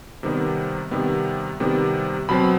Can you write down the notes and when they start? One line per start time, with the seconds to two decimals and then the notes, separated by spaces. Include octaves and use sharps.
0.23 C3 D#3 G3 B3
0.91 C3 D#3 G3 B3
1.60 C3 D#3 G3 B3
2.29 B2 F#3 C4 B5